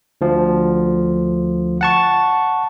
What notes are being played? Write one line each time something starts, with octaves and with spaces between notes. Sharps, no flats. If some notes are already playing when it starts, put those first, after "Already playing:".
D2 F3
F#5 A5 C#6